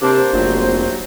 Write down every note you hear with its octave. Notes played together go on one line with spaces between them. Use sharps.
C3 A#3 D4 C5
F1 A#1 C3 F#3